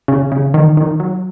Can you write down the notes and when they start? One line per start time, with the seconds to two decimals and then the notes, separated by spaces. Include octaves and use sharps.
0.08 C#3
0.32 C#3
0.54 D#3
0.77 D#3
1.00 F#3